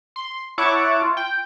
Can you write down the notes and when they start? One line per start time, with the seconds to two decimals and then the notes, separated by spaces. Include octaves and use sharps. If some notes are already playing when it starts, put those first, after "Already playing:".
0.16 C6
0.58 E4 C#5 F#5 A5 C#6 D6
1.02 F4
1.17 G5